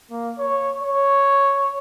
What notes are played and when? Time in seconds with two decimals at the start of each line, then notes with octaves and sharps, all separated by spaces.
0.10 A#3
0.39 C#5
0.83 C#5